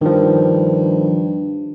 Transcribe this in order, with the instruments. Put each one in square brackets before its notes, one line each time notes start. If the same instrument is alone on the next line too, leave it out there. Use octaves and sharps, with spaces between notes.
[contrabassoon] G2 [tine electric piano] D#3 F3